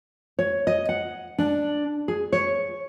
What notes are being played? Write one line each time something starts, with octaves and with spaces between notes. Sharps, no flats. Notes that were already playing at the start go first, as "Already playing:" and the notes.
C#5
D#5
F#5
D4
G#4
C#5